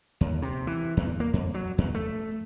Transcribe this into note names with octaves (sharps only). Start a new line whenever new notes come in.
D#2
C3
E3
E2
A#3
F2
F#3
E2
A3